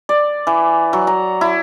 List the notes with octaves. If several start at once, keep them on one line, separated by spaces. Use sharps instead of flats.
D5
E3
F#3
A#5
E4